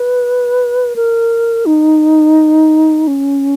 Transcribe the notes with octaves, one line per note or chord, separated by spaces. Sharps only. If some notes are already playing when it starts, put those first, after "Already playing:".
Already playing: B4
A#4
D#4
C#4